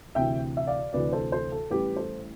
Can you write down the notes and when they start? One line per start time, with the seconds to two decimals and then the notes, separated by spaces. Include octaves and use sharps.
0.15 D2 C3 E3 E5 G5
0.57 E5
0.67 D5 F5
0.93 D2 C3 E3 B4 D5
1.13 A4 C5
1.32 A4 C5
1.52 A4
1.70 A1 A2 G3 G4 B4
1.96 A4 C5